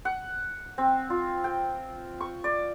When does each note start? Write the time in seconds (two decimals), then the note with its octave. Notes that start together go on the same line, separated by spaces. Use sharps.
0.05 F#5
0.78 C4
1.10 F4
1.44 G5
2.21 C#6
2.44 D5